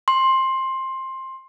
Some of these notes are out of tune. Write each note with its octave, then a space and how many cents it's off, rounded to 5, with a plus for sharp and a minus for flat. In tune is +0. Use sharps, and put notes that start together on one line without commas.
C6 +15